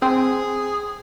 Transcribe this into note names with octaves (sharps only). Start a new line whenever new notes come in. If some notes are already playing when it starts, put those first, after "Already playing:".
C4 G#4